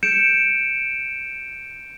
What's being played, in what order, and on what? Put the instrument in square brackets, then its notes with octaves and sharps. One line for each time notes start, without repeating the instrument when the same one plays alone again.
[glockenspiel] G6 C#7 D7 E7